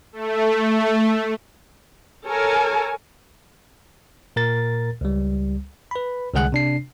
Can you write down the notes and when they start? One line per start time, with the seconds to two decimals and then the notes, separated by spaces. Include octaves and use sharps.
0.13 A3
2.26 A4 A#4 C#5 G#5
4.36 A#2 A#4 A6
5.01 C#2 G3
5.91 B4 B5
6.34 C2 D3 G#3 G#4 F#5 F#6
6.52 C3 D4 C7